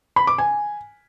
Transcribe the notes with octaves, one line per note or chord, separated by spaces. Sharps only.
B5
D6
G#5